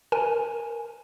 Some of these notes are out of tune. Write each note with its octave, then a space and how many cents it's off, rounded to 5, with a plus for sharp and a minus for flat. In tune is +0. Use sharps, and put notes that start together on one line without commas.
A#4 +0 G#5 +0